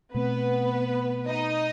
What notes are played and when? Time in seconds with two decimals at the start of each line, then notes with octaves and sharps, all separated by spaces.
0.14 B2 A3 B3 C4 B4
1.27 D#4 D#5